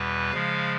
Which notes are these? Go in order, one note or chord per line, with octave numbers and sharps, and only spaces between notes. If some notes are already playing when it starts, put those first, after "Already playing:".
Already playing: E2 B2 G3 B4
C#3 F3 G#3 F5